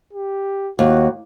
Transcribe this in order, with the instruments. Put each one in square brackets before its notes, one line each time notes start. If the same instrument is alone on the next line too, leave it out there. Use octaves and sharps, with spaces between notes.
[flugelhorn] G4
[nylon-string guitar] D#2 [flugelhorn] F#4